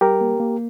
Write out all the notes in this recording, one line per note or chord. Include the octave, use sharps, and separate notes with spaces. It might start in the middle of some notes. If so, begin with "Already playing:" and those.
G3 G4 A#4
A#3
A#3